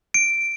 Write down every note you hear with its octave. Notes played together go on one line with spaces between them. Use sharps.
D7